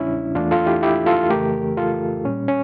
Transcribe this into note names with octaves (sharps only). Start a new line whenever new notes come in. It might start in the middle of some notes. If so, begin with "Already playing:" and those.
Already playing: E2 C#3 G3 C#4 D4 E4
E2 E3 A3 D4 F4
F4 A4
E4 G4
E4 G4
F4 A4
F2 C#3 E3 A3 G4 A#4
F4 A4
A#2 G3 C#4
C#4